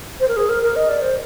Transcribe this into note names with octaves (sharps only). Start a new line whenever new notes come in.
C5
A#4
G#4
A#4
A#4
D#5
D5
C5